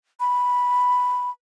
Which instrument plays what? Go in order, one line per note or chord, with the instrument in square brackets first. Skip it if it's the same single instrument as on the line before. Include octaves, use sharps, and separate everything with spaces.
[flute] B5